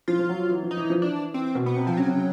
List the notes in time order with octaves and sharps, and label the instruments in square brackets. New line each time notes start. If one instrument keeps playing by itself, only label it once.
[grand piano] F3 [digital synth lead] F4
[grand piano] F3
F#3
E3
F3
[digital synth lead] D#4
[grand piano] E3
F3
[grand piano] E3 [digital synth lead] D4
[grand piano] E3 [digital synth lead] C4
[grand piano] B2
[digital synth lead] B3
[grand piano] C3
[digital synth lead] F3
[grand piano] C#3 [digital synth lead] F#3
[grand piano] C3
C#3